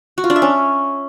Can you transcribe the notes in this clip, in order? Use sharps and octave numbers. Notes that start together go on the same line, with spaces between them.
F#4
F4
D4
E5
C#4